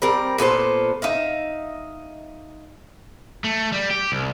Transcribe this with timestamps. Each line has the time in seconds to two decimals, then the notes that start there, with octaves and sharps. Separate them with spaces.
0.02 G3 C4 A#4
0.38 A#2 B3 A4 C5
1.02 D#4 E5 F5
3.44 A3
3.72 G3
3.91 G4
4.12 C2